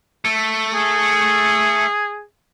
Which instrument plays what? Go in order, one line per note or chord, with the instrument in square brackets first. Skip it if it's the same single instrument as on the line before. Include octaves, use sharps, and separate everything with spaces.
[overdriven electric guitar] A3
[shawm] G#4